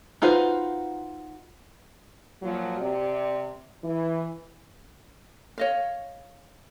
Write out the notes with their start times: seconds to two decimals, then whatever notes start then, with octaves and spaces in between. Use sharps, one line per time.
0.22 D#4 F4 F#4 B4 C5
2.42 A#2 F3 F#3
2.80 C3 D5
3.83 E3
5.58 C#5 D#5 F5